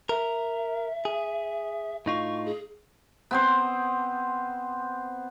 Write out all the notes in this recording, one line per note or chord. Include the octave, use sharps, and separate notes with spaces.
A#4 E5
G#4
A2 D#4 F4 C#6
G#4
B3 C4 C5